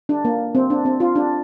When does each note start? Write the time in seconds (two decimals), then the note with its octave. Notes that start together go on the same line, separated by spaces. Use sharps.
0.09 D4
0.25 A#3
0.55 C4
0.70 D4
0.85 C4
1.00 F4
1.15 D4